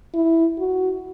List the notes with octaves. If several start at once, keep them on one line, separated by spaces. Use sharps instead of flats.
E4
F#4